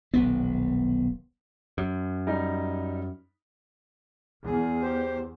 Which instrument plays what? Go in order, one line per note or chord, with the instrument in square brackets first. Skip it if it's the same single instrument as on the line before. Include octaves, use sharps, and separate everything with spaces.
[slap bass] D#1 B1 B3
[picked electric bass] F#2
[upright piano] G3 D#4
[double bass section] E2 [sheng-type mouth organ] G#4
[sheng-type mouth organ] G4 C5